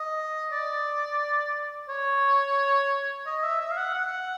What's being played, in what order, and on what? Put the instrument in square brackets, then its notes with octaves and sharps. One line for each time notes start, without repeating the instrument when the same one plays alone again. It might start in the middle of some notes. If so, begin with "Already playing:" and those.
Already playing: [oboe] D#5
D5
C#5
D#5
E5
E5
F5
F#5
F#5